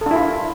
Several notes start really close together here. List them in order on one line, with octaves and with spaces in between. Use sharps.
A4 D4 E4 F4